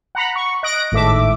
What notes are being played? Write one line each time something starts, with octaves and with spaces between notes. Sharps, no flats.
F#5 A#5 B5
C#6
D#5 F#6 A#6 D7
G#1 A2 A3 E5 D6